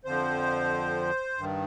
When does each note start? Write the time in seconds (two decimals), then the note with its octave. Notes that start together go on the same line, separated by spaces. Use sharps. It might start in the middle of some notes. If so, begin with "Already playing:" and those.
0.04 F2 D3 F3 C5
1.38 G2 D#3